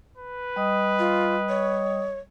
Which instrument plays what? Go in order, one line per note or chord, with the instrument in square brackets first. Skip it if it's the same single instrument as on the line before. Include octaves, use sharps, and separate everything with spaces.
[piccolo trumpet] B4
[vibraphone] G3 D#5 D#6
[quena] F4
C#5